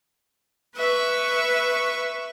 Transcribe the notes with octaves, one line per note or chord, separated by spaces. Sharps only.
B4 E5 C#6